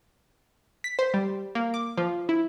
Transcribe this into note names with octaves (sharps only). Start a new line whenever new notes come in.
B6
C5
G3
A#3
D6
F3
E4